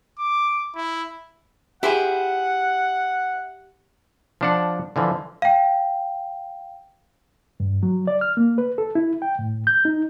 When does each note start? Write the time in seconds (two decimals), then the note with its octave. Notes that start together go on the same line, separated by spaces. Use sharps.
0.19 D6
0.76 E4
1.83 E4 G4 G#4 C5 F#5
4.41 F3 D4 F#5
4.96 D3 E3 F3
5.42 F5 G5
7.60 G2
7.83 F#3
8.07 D5
8.21 F6
8.37 A#3
8.58 B4
8.78 A4
8.95 E4
9.22 G5
9.39 A2
9.67 G6
9.85 D#4